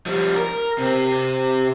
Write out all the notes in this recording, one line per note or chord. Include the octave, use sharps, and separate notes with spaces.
F3 G3
A#4
C3 C4